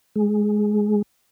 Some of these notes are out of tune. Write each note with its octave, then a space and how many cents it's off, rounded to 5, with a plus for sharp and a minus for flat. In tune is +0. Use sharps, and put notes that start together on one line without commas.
G#3 +10